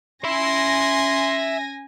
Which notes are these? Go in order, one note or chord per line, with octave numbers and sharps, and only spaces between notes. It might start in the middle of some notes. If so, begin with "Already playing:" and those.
C#4 E5 G#5 B5 C6 A#6